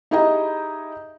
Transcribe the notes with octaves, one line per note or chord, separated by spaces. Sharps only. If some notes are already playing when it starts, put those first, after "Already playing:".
D#4 E4 G4 G#4 D#5 A#5